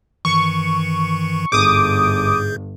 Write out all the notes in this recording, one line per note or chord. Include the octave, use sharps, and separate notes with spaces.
G2 D#3 E3 C#6
G1 G#2 G#4 D6 D#6 G6